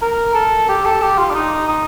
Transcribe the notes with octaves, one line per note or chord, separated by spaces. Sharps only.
A#4
A4
G4
A4
G4
F4
D4
D#4
D#4